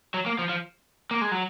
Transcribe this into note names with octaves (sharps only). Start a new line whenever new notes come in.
F#3
A#3
F3
F3
A#3
G#3
F#3